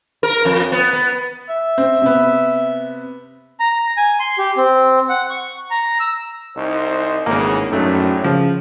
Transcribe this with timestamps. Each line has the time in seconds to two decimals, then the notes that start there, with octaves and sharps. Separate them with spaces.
0.23 A#4
0.45 F2
0.72 B3
0.93 B3
1.49 E5
1.78 C4
2.02 C3 B3
3.60 A#5
3.97 G#5
4.20 C6
4.38 G4
4.57 C4
5.09 F#5
5.30 C#6
5.71 A#5
6.00 E6
6.55 C2 D#4 C5
7.26 G#1 E2 A2 C#3 A#3
7.72 A#1 F#2 A2 F#3 A3 D#4
8.24 C#3 F3